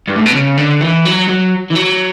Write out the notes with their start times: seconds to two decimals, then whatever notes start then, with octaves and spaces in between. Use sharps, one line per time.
0.08 G2
0.16 A2
0.26 B2
0.34 C#3
0.57 D3
0.81 E3
1.05 F#3
1.29 F#3
1.71 E3
1.76 F#3